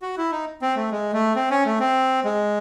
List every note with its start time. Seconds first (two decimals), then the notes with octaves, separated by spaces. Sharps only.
0.02 F#4
0.18 E4
0.32 D#4
0.62 C4
0.76 A3
0.91 G#3
1.13 A3
1.36 C4
1.50 C#4
1.65 A3
1.80 C4
2.25 G#3